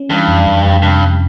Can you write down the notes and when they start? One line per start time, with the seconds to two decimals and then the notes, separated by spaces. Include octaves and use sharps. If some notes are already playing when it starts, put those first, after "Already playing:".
Already playing: C#4
0.10 G2 E3
0.28 F2
0.47 F2
0.65 F2
0.82 G2 C3
1.01 F2